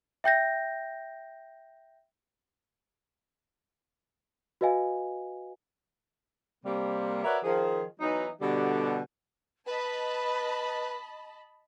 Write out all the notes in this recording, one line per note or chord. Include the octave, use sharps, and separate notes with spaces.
E5 G5 G6 A#6
F#4 B4 D#5 F5 G#5
C3 G3 A#3
F#4 A#4 B4 C#5 D5 E5
D#3 F3 G#4
E3 F#3 B3 D#4
B2 D3 G3
B4 D#5 A5 B5